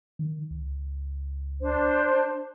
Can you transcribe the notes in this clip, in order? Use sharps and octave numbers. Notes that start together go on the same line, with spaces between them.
D#3
C#2
D4 C5